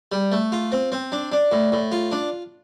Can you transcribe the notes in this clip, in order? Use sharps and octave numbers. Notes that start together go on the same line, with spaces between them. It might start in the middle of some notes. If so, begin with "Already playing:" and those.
G3
A3
F4
C4
C4
D4
D4
A2
A2
F4
D4